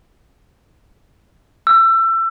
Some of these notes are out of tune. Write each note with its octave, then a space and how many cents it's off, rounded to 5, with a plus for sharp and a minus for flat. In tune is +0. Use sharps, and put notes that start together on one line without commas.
E6 +25